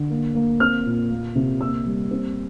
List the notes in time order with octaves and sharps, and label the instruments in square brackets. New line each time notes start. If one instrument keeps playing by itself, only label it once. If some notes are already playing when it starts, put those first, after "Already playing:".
Already playing: [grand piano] D3
A#3
A#3
C4 F6
A#2
A#3
C3
A#3 E6
G3
C4